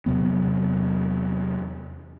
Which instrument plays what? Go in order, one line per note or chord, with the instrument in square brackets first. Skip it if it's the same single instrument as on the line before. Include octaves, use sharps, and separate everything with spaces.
[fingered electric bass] E2 C3 F#3 B3